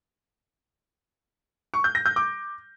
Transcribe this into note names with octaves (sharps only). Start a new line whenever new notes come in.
C#6
G6
A#6
G6
D6